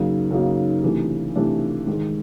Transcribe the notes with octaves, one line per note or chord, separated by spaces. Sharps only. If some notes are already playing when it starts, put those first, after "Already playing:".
Already playing: F#2 C#3 F#3 A#3 D#4
F#2 C#3 F#3 A#3 D#4
C3 E3 A3 D4
C3 E3 A3 D4
G#2 D#3 G#3